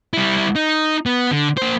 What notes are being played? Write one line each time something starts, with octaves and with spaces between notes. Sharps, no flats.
G3 E4
D#4
B3
D3
A#3 C5